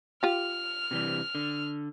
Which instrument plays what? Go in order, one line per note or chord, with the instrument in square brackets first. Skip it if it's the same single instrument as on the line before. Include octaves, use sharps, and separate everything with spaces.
[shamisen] F4 G4 [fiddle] F6
[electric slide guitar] C3 E3 G3
D3